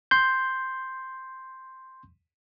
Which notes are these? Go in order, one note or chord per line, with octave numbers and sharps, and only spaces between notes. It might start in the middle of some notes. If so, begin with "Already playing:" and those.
C6 G6